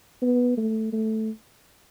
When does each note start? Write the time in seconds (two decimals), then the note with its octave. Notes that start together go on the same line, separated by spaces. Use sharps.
0.22 B3
0.57 A3
0.93 A3